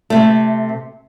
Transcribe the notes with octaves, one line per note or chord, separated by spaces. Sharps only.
C3 A3